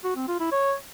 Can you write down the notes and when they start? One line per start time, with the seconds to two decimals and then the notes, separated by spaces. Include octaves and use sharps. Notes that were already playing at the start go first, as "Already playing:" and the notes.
0.04 F#4
0.16 C4
0.28 F4
0.40 E4
0.52 C#5